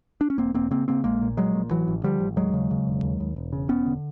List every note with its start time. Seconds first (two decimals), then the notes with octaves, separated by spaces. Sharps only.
0.21 D4
0.30 C#4
0.38 E1 A#3 C4
0.54 E1 A#3 C4
0.71 C#3 A#3 C4
0.88 C#3 A#3 C4
1.04 A#1 G#3 A#3
1.22 A#2
1.37 A#1 F#3 G#3
1.55 A#2
1.70 A1 E3 F#3
1.88 A1
2.04 D3 F3 G3
2.20 A1
2.36 D#2 F#3 G#3
2.54 C#3
2.71 C#3
2.87 E1
3.03 D#2
3.20 D#2
3.36 E1
3.53 C#3
3.69 E1 B3 C#4
3.86 D3